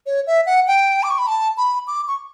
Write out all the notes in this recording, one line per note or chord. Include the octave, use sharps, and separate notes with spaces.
C#5
E5
F#5
G5
D6
C#6
B5
A5
B5
D6
C#6